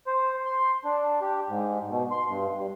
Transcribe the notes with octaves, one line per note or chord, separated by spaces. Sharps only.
C5
C6
D4
G4
G#2
B2
C6
G2
G2